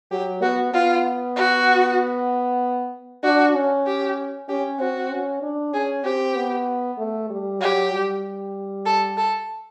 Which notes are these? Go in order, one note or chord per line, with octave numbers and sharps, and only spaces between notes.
F#3 G4
B3 F#4
B3 F4
F#4
D4 F#4
C#4
G4
C#4 G4
C4 F#4
C#4
D4
C#4 G#4
C4 G4
B3
A3
G3
F#3 G4
G3
A4
A4